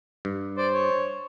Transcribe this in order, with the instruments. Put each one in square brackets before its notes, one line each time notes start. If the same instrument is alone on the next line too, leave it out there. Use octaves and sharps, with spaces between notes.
[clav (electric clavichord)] G2
[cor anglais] C5 [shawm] D5
[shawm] C#5